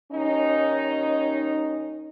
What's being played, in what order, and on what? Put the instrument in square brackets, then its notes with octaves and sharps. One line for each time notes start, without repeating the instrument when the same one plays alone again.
[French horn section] D#2 C#4 D#4